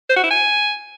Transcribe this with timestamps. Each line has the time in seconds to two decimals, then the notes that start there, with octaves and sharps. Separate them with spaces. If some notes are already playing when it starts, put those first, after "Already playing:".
0.09 C5
0.16 F#4
0.23 E4
0.30 G#5